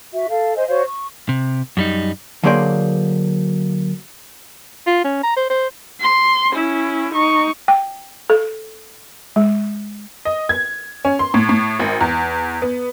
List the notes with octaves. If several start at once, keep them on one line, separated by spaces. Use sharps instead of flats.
F#4 E5
A4 F5
C5 D#5 G#5
F#4 C5 C#5 F5
C#6
C3
F#2 G3 D#4
D3 F#3 A#3 G#4 C5 D5
F4
C#4
A#5
C5
C5
C6
C#4 E4
D#4 C#6
G5
A4
G#3
D#5
G#6
C#4
C6
A2
A2
G#1
E2
B3